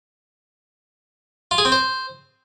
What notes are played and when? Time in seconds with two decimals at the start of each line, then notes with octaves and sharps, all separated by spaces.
1.51 F4
1.58 G#4
1.65 C4
1.72 C5